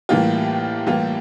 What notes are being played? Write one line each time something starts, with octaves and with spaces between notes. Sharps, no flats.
A2 E3 G3 A#3 F4
A2 E3 G3 A#3 F4